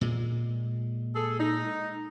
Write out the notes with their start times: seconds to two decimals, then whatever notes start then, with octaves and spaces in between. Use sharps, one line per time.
0.01 A#2 G#3
1.15 G#4 A4
1.40 D#4